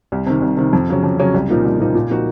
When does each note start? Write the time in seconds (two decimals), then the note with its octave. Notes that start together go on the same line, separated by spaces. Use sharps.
0.12 C2
0.27 C3 D#3
0.42 C2
0.57 C3 D#3
0.73 F2
0.89 C#3 F#3 C#4
1.03 F2
1.19 C#3 F#3 C#4
1.34 C2
1.49 A#2 F3 A#3 D#4
1.64 C2
1.79 A#2 F3 A#3 D#4
1.95 A#2
2.10 F3 A#3 D#4 F#4